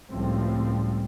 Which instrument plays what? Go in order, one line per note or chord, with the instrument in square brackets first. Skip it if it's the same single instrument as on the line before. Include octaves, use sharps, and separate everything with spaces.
[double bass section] C#2 A2 F3 G3 C4